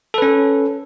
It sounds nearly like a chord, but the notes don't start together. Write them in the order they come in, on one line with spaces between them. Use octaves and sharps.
A4 B4 C#4